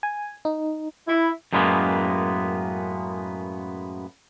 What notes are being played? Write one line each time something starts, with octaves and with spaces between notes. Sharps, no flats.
G#5
D#4
E4
F#2 A2 G#3 A#3 B3